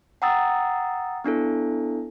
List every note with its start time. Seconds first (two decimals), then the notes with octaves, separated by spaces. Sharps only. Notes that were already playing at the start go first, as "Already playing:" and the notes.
0.22 F#5 G5 A#5 D#6 E6 A6
1.24 B3 D4 E4 A4